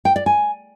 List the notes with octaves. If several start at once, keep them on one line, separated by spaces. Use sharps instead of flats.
G5
D5
G#5